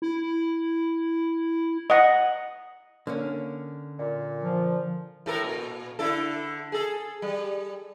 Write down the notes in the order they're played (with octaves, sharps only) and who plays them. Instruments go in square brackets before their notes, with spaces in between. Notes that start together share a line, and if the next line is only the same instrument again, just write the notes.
[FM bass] E4
[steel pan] D#5 F#5
[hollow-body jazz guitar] D3 A#3 C#4
[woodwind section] A#2
[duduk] F3
[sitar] A2 A4 A#4
A#2
D3 E4 A4
G#4 A4
G3